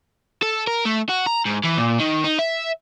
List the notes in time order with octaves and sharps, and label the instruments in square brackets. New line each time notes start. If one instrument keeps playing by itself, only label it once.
[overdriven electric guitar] A4
A#4
A3
F#4
A#5
G#2
E3
A#2
D#3
D#4
E5